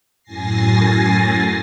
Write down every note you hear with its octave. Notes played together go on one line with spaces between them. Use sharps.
F#2 A2 G#5 A6 A#6 C7